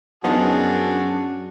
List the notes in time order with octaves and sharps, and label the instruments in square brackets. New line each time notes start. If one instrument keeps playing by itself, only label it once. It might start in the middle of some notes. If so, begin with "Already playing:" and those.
[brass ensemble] F#2 [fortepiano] F3 B3 D#4 [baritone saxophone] D4 [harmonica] F#4 G#4 A5